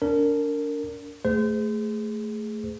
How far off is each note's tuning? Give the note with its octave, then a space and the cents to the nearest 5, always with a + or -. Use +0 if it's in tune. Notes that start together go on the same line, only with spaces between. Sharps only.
D4 -30 A#4 -20
A3 +0 G#4 +0 C5 -35